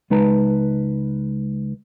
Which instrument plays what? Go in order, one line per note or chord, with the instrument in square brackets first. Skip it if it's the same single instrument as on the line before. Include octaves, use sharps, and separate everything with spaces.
[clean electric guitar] C#2 G#3 D#4 B4 A5 A#5